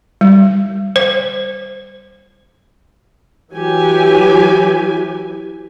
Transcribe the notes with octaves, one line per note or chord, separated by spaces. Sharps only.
G3
C5
E3 F#3 G4 G#5